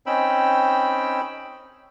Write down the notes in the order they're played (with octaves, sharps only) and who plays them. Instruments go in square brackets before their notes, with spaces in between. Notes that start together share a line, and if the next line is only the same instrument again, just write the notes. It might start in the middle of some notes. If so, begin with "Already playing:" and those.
[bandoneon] C4 C#4 D#4 G5 B5 E6